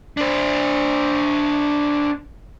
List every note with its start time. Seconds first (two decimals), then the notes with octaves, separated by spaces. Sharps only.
0.17 D4 C5